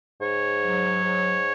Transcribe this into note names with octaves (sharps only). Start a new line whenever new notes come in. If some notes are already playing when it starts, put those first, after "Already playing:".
G#2 C#5
F#3
G#2